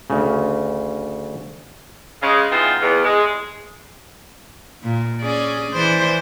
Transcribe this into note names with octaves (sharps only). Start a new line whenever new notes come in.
D2 C#3
C#3 G#3
E3 G#3 B3 C4 D#4 F4
E2
G#3
A#2
C#4 G#4 D5
E3 C5 D5